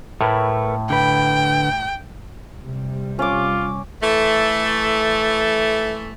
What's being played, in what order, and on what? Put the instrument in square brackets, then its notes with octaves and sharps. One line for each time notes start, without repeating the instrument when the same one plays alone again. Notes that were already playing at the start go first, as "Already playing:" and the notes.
[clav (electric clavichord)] A2 [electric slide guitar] A3 A#4 B4
[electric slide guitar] D3 B4 [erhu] G5
[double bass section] C3 G3
[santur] C#4 D6 [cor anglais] F4
[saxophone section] E3 A3